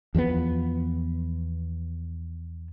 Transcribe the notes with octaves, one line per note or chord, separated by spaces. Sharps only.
E2 F3 F#3 B3